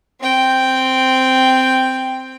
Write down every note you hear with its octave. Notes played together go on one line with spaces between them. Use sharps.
C4 G5